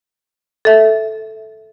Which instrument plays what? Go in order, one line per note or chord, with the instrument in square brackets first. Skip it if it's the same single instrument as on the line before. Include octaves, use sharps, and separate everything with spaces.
[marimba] A4 E5